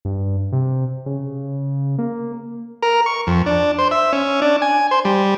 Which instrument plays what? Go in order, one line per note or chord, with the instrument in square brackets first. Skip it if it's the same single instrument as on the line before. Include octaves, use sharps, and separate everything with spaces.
[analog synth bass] G2
C3
C#3
A#3
[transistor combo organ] A#4
C#6
F2
D4
C5
E5
C#4
D4
G#5
C5
G3